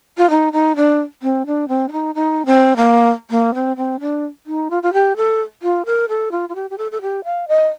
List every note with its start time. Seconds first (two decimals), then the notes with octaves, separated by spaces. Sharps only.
0.18 F4
0.30 D#4
0.53 D#4
0.76 D4
1.23 C4
1.46 D4
1.68 C4
1.88 D4
1.92 D#4
2.15 D#4
2.46 C4
2.76 A#3
3.31 A#3
3.54 C4
3.77 C4
4.00 D4
4.46 D#4
4.71 F4
4.83 F4
4.93 G4
5.17 A4
5.63 F4
5.86 A#4
6.09 A4
6.32 F4
6.49 F4
6.55 G4
6.70 G4
6.78 A4
6.92 A4
7.02 G4
7.24 F5
7.48 D#5